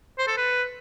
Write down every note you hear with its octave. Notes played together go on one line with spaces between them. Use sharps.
C5
A4
B4